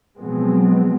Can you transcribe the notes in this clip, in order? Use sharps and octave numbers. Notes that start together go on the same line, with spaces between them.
B2 F3 F#3 G#3 B3 C4